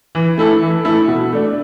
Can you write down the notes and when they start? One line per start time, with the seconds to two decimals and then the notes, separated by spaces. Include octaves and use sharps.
0.15 E3
0.38 A3 E4 A4
0.62 E3
0.85 A3 E4 A4
1.08 B2
1.32 A3 D4